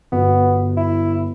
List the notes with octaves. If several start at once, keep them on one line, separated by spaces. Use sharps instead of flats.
G1 B3 F#4
E4